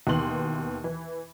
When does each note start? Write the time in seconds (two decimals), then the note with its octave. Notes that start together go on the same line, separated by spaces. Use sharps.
0.07 D#2 B2 E3 C6 F#7
0.84 E3